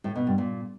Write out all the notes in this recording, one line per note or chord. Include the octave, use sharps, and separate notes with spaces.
A2
B2
G2
A#2